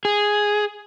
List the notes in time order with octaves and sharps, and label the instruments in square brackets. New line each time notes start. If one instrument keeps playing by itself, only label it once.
[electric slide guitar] G#4